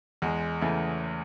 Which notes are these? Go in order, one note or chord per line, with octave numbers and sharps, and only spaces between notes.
E2 G#3
C#3 E3 A3